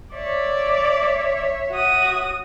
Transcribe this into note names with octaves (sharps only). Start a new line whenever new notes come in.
C#5 D5 E5
F#4 D#6